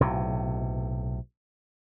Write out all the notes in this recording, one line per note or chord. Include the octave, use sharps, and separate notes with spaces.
B1 A2 C3